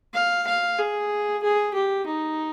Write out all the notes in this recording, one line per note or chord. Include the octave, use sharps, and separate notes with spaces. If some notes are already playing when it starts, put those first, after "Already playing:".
F5
F5
G#4
G#4
G4
D#4